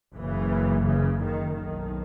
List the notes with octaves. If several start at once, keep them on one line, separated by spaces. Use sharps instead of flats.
F#1 F#2 C#3 E3
C#3
D#3
B1 A2 D#3